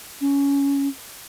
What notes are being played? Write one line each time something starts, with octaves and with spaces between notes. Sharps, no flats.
C#4